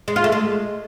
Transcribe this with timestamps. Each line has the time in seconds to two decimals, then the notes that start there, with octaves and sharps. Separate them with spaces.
0.08 G#3
0.16 F4
0.24 A3
0.32 G#3